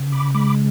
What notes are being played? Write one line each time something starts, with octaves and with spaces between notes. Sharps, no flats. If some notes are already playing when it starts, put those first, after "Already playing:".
Already playing: C#3
B5 D6
G#3 B5 D6